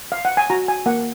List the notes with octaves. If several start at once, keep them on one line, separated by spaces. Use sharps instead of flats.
F5
F#5
G#5
F#4 A#5
G#5
A#3 F#5